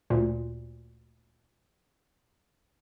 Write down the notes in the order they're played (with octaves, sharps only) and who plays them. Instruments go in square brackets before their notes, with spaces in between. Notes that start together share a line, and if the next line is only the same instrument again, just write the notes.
[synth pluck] D2 A#2